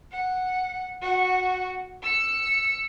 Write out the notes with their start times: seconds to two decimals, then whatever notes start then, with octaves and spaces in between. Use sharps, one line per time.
0.12 F#5
1.02 F#4 F#5
2.03 E6 C#7